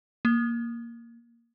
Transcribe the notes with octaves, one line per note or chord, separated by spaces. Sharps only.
A#3